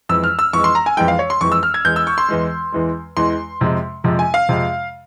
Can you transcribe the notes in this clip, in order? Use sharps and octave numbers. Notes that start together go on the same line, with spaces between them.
F2 E3 G#3 E6
F6
E6
F2 E3 G#3 C#6
C6
A#5
G#5
F2 E3 G#3 G5
F5
C#5
C6
F2 E3 G#3 C#6
E6
F6
G#6
E2 E3 G#3 G6
E6
C#6
C6
E2 E3 G#3
E2 E3 G#3
E2 E3 G#3 C6
F2 C3 F3 G#3
F2 C3 F3 G#3
G#5
F5
F2 C3 F3 G#3